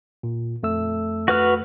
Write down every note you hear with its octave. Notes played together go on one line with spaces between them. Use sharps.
A#2
F2 A3 E6
F#4 B4 F6